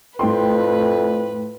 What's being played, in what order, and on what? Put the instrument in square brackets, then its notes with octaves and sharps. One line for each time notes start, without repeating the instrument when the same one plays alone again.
[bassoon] F2 [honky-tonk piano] A2 G5 C6 [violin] B4